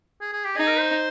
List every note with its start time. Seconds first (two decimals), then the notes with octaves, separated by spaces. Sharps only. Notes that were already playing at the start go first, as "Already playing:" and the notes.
0.21 G#4
0.33 G#4
0.45 G4
0.56 D#4 G#4
0.67 A#4
0.79 C5